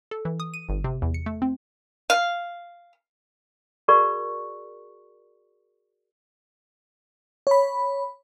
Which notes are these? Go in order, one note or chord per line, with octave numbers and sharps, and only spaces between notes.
A4
E3
D#6
D#7
G1
C3
E2
C#7
A3
C4
F5
F#4 G#4 A#4 D5 C#6
C#5 B5